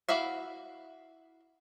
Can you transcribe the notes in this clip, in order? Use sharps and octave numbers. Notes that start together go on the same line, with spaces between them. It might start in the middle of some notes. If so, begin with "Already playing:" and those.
E4 F#4 E5 F5